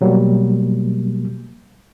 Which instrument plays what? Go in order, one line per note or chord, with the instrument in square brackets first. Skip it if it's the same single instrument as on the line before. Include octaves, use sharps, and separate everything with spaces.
[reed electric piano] B2 F#3 G3 A#3